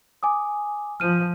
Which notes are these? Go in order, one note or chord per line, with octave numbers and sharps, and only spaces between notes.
G#5 D6 D#6
F3 F6 D#7